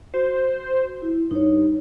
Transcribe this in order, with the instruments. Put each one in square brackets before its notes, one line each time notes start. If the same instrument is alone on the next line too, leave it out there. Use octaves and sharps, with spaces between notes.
[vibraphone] F#4 [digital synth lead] C5
[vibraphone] E4
[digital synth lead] G2 [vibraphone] D#4 C#5